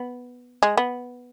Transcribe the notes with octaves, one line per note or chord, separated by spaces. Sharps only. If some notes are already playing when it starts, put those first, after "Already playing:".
Already playing: B3
G#3
B3